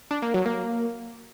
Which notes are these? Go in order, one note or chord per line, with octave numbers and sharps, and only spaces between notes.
D4
A#3
F#3
A#3